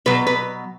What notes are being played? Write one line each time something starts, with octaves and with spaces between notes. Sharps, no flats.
B2 F#3 B4
B4